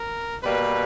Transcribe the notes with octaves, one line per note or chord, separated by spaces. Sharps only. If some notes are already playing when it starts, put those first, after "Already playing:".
Already playing: A#4
B2 G3 A#3 B4